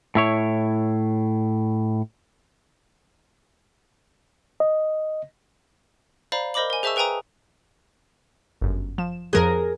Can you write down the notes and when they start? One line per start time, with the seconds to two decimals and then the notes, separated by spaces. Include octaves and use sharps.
0.15 A2 E4 C#5
4.60 D#5
6.32 C5 D5 F5 A#5 B5
6.54 A#4 C5 D#5 B5 D6 F#7
6.70 A#4 G#5
6.83 G#4 C5 E5 A5 C#6 E6
6.96 G#4 B4 G5 G#5 A#5 D#6
8.62 G1 F#2
8.98 F3 E7
9.33 F2 F3 G#4 A#4 F#6